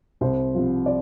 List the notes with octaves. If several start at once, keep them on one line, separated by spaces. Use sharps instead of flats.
C2 C5
C3 F3
D5